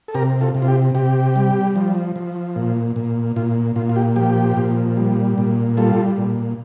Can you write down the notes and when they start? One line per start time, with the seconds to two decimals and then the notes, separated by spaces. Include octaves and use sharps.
0.08 A4
0.15 C3 G4 A#4
0.41 F4 A4
0.55 C3
0.62 F4
0.68 G4
0.95 C3 G4
1.36 G3
1.76 F3
2.16 F3
2.56 A#2
2.96 A#2
3.36 A#2 F4
3.76 A#2 F4
3.89 F4
3.96 G4
4.16 F3 G4
4.57 A#2
4.97 G3
5.38 A#2
5.77 G3 F4 A4
6.18 A#2